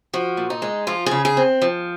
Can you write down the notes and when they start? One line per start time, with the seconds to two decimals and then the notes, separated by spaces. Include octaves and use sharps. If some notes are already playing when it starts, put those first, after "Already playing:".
0.14 F3 F#4
0.37 A#2
0.50 D#4
0.62 G#3
0.87 F3 F4
1.06 C#3 G#4
1.25 G#4
1.37 C4
1.62 F3